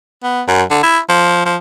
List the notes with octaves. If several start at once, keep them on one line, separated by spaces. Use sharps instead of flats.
B3
F#2
D3
E4
F3
F3